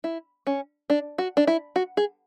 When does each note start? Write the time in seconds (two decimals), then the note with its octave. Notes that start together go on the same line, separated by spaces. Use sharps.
0.04 E4
0.47 C#4
0.90 D4
1.18 F#4
1.37 D4
1.47 E4
1.76 F#4
1.97 G#4